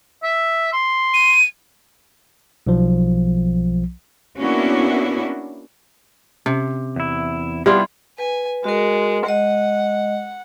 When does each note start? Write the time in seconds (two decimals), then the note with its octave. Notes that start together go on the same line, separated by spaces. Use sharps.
0.23 E5
0.73 C6
1.14 D#7
2.67 B1 F3
4.37 A#3 B3 C#4 D4 E4 F#4
6.46 C3 C#4
6.96 E2 E4
7.66 G3 B3 D4 E4 F4 G4 D5 C6
8.18 B4 G#5
8.64 G#3 F#4 A#4
9.26 G#3 D#5 F#5